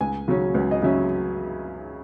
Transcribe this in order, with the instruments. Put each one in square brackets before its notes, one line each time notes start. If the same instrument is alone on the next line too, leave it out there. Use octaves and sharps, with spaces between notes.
[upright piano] C#2 G#5
C#3 F#3 C#4
C#2
D#5
C#3 F#3 C#4 E5